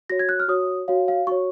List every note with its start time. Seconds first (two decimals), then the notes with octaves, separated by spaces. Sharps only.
0.10 F#4 C#5 A#6
0.19 G#6
0.29 F#6
0.40 F6
0.48 F#4 C#5 D#6
0.88 F#4 C#5 F5
1.08 F5
1.27 F#4 C#5 C#6